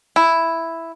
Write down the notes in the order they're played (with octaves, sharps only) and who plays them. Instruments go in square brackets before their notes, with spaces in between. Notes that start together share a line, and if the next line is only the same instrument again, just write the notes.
[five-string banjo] E4